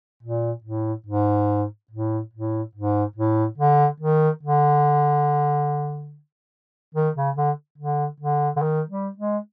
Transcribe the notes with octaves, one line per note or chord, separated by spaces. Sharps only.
A#2
A2
G#2
A2
A2
G#2
A2
D3
D#3
D3
D#3
C#3
D3
D3
D3
D3
D#3
G3
G#3